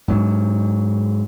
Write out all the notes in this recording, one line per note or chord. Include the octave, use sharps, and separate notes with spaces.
G#2 F#3